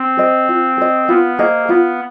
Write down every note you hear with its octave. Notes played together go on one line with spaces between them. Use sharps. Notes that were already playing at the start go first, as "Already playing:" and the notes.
Already playing: C4
G#4 C5 D#5
F4
G#4 C5 D#5
B3 F4
A#3 G#4 C5 D#5
B3 F4